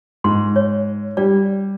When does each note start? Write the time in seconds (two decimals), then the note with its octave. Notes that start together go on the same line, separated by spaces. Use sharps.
0.24 G#2 C6
0.56 C#5
1.17 G3 D5